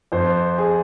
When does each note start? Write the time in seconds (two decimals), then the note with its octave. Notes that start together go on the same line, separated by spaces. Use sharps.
0.12 F2 C5
0.58 G#4